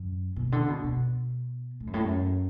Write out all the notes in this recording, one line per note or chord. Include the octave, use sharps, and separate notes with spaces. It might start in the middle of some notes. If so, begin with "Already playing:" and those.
Already playing: F#2
B2
D3
B2
B2
A2
F#2
A2
F#2